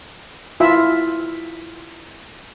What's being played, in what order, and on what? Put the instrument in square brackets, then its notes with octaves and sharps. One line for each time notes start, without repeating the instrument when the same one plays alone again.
[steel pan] E4 F4 E5